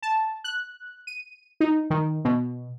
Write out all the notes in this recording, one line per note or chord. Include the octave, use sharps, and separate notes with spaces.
A5
F#6
D#7
D#4
D#3
B2